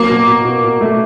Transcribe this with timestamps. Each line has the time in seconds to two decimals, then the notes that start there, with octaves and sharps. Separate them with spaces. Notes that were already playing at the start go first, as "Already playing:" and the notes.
Already playing: F#3 A#3
0.09 B2
0.27 B2
0.45 B2
0.64 B2
0.81 A3